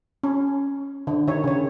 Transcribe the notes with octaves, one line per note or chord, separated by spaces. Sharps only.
C#4
D3
D#3 C#5
C#3 C#5